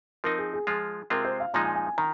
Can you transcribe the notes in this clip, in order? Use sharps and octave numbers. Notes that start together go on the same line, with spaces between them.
F3 C4 D#4 A#4
G#4
G#4
F3 G#3 F4 G#4
C3 G#3 C4 F4 A#4
C5
F5
A#2 F3 G#3 D#4 A#5
G#5
G#5
G#5
D#3 A#5